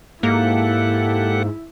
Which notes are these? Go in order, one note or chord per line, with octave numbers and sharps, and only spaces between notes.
G#2 A#3 E4 G4 A4 F#5